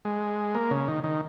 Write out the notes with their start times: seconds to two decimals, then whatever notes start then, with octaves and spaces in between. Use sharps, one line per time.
0.05 G#3
0.55 A#3
0.71 C#3
0.88 D#3
1.04 D#3